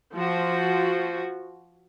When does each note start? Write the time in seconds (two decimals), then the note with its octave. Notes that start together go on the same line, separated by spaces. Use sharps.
0.13 F3 F#4